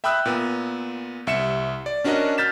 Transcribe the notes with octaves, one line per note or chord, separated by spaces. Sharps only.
E5 G5 B5 D#6 E6 F#6
A#2 B3
C2 E5 C#7 E7
D5
C#4 D4 F#4 A#4 D#5
F6 G6 A6 B6 E7